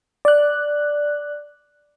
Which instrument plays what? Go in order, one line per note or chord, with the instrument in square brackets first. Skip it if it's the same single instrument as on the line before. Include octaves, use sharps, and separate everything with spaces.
[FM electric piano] D5 F#6